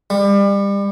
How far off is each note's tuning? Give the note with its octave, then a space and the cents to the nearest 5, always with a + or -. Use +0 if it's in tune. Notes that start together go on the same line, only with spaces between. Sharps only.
G3 +30